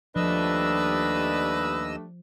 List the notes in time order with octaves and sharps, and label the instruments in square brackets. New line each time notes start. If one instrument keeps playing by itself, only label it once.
[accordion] D#2 D#5 E6 [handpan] F3 [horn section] G3 A3 D4 [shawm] B4